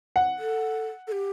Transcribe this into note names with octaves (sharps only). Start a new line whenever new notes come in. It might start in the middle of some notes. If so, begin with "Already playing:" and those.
F#5
A4
A4
G4